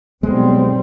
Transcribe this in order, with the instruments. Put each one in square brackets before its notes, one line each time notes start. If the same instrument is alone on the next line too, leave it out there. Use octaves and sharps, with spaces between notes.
[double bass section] B1 G3 C4 [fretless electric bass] G#3